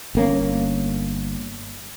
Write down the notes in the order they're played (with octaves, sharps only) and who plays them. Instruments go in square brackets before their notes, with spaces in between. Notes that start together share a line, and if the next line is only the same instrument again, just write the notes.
[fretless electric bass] G1 A#3 C#4